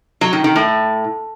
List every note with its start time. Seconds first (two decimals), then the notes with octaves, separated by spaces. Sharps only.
0.21 F#3
0.33 D#3
0.44 D#3
0.56 A2